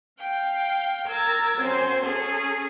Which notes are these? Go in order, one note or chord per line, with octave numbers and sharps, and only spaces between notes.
F5 G5
A#4 E6 G#6 A6
F#2 C4 C5 G#5
C#4 G#4 A4